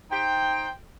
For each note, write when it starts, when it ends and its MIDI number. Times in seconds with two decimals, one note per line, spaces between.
0.10 0.68 63
0.10 0.68 72
0.10 0.68 79